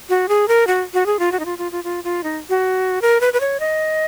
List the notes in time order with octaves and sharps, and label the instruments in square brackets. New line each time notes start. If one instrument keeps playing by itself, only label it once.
[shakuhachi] F#4
G#4
A#4
F#4
F#4
G#4
F4
F#4
D#4
F4
F4
F4
F4
F4
D#4
F#4
A#4
B4
B4
C#5
D#5